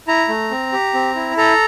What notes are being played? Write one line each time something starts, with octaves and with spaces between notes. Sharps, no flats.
E4 A#5
A3
C4
G4
C4
E4
A4 A#5